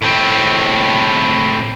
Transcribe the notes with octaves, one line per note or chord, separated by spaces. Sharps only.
A2 C4